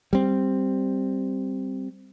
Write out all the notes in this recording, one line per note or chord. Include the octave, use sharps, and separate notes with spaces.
G3 C4